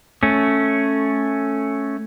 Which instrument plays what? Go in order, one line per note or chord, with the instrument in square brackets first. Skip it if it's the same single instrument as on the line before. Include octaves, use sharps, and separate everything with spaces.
[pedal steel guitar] A3 C#4